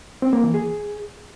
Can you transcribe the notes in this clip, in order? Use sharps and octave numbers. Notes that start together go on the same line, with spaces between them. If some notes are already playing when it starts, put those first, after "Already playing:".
C4
A#3
E3
G#4